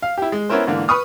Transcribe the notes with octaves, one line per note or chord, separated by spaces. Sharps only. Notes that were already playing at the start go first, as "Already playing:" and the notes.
F5
E4 G4
G#3
B3 C#4 E4 A#4 C5
G#2 D3 E3 A#3
B4 B5 C#6 D#6 F6